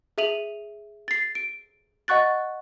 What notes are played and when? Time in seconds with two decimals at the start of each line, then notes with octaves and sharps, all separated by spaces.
0.18 G#4 E5 D#7 F7 F#7
1.08 A6 C7
1.35 D7
2.08 D#5 F#5 C#6 F#6 A6